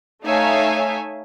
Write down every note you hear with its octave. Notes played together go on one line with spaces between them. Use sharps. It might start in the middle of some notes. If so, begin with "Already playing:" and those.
A3 D#4 C#5 E5 F5 G#5